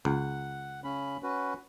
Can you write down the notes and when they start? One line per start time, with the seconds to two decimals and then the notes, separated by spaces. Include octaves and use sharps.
0.05 C#2 F#5
0.84 C#3 C#4 B5
1.23 C#4 F#4 B4